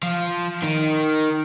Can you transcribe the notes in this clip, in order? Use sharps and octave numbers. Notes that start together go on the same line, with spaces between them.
F3
D#3